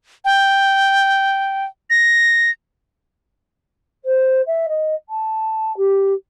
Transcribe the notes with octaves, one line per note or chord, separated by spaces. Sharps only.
G5
A#6
C5
E5
D#5
A5
G4